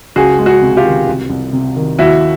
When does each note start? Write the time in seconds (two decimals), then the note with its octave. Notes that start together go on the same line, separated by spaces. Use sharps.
0.16 C#2 F#4 G#4
0.39 G#3
0.46 F#4 G#4
0.62 C3
0.77 F4 G4
0.85 D#3
1.07 C2
1.30 C2
1.53 C3
1.76 D#3
1.98 D#2 E4 F#4